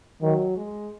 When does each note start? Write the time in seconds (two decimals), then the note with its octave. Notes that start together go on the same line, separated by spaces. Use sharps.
0.22 D#3 F#3
0.57 G#3